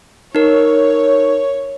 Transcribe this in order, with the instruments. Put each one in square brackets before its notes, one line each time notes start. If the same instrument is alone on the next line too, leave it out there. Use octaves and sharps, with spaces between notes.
[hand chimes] D#4 A#4 [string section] C#5